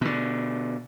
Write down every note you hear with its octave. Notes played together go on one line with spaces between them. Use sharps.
B2 D3